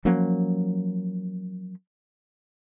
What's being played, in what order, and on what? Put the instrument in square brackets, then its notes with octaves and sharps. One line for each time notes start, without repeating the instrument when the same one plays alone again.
[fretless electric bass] F3 F#3 A#3 C#4